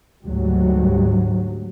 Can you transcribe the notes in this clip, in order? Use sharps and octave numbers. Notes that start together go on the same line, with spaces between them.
D2 G#2 F#3 G3